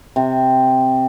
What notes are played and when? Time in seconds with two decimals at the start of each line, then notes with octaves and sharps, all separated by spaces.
0.16 C3